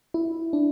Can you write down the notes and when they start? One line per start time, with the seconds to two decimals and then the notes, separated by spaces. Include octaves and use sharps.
0.14 E4
0.53 D4